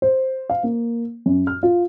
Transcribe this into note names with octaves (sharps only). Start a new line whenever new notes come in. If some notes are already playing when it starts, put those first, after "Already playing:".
C5
F5
A#3
F#2
F6
F4